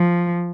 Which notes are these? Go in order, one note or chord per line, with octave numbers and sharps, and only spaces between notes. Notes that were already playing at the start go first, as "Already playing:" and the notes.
Already playing: F3